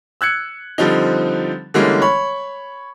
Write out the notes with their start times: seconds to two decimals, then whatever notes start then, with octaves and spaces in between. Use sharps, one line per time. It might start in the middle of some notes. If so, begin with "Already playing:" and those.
0.21 E6 F#6 G#6 C#7
0.78 D3 F3 G3 C4 D#4
1.74 D3 E3 G3 G#3 A#3 C#4
2.02 C#5 B5